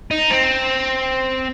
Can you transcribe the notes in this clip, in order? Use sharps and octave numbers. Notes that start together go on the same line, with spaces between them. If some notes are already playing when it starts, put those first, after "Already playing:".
D#4
C4